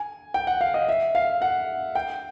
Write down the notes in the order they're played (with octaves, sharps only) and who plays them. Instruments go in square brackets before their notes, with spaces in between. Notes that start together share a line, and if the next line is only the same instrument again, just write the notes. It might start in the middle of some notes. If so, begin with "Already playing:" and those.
Already playing: [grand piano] G#5
G5
F#5
F5
D#5
E5
F5
F#5
G5